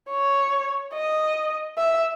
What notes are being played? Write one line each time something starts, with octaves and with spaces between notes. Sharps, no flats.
C#5
D#5
E5